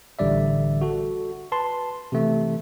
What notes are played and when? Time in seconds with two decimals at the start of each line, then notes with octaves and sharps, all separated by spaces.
0.19 A1 D3 G3 D5 E5
0.81 F#4 A4
1.52 B4 A5 C6
2.12 C3 E3 A3